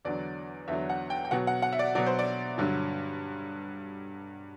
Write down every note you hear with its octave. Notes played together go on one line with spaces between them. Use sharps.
E2 D3 F#3 D5
E2 D3 F#3 E5
F#5
G5
G5
B2 F#3 F#5
F#5
F#5
E5
D5
B2 F#3 D5
C5
D5
G2 D3 F#3